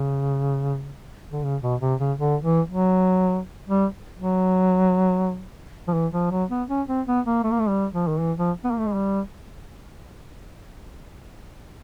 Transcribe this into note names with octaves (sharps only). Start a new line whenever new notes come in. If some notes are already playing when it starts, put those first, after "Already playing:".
Already playing: C#3
D3
C#3
B2
C3
C#3
D3
E3
F#3
G3
F#3
F3
E3
F3
F#3
B3
C#4
C4
B3
A#3
A3
A#3
A3
G3
F3
D#3
E3
F3
B3
A#3
A3
G#3
G3